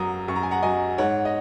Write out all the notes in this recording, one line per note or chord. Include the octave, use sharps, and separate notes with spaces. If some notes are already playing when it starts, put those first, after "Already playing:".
Already playing: F#2 F#3 A#5 D#6
F#2 C#6
A#5
G#5
F#5 A#5
F#3 D#5 G#5
G#2 C#5 F#5
D#5